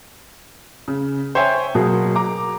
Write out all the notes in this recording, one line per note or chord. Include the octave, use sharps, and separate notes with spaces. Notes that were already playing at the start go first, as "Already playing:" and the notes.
C#3
C5 C#5 E5 G5 G#5
B2 F#3 A#3 G#4
A#5 D6